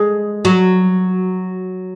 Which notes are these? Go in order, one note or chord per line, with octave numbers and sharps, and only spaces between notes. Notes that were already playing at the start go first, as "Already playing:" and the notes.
Already playing: G#3
F#3